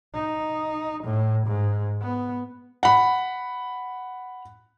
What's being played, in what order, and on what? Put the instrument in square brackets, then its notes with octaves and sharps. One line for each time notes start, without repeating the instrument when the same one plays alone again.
[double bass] D#4
A2
G#2
B3
[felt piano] F#5 B5